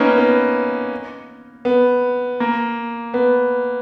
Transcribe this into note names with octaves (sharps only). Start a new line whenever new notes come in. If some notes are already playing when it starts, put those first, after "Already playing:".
Already playing: A#3 B3 C#4 D#4
B3
B3
A#3
B3